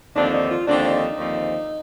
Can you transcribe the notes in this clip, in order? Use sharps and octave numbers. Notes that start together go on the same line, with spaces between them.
D#2 D3 F3 C4 D4
D#4
F4
D#2 D3 F3 C4 D4
D#4
D#2 D3 F3 C4